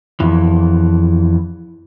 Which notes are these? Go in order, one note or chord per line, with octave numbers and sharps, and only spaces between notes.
F2 E3